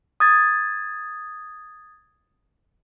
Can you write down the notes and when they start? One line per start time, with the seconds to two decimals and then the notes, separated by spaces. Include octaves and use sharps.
0.20 D#6 G#6 A6